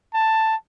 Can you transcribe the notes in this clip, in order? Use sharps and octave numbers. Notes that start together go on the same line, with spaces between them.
A5